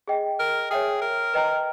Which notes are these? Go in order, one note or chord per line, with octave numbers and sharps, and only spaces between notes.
G#4 D#5 G5
A#4
G#4 C#5 E5 G5
A#4
B4 D#5 G5 A#5